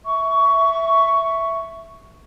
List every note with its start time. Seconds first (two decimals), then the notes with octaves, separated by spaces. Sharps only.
0.05 E5 C#6